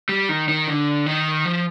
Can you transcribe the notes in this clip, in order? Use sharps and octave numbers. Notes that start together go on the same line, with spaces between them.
G3
D#3
D#3
D3
D#3
F3